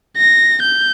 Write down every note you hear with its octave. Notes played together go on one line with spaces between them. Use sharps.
A#6
G6